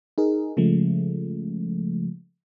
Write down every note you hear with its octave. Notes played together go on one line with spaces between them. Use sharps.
D#4 G#4 A#4
C#3 F3 G#3 A3